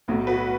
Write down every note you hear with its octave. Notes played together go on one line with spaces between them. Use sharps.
B1 A2 F#3
F#4 B4